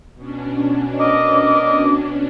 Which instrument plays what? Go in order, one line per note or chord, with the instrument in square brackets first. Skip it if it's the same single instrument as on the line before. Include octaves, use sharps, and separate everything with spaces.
[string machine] B2 C#4 D4
[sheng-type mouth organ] A#4 D#5 [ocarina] D6